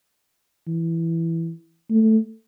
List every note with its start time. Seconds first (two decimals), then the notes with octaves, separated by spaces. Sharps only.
0.67 E3
1.91 A3